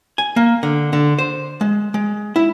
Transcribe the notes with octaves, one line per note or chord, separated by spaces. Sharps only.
G#5
A#3
D3
D3
C5
G#3
G#3
E4